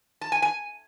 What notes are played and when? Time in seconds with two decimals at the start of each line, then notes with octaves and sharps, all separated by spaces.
0.21 A5
0.32 G#5
0.42 G#5